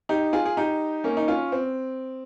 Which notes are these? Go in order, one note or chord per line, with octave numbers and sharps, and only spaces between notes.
D#4 G4
F4 G#4
G#4
D#4 G4
A#3 C#4
D#4
C#4 F4
C4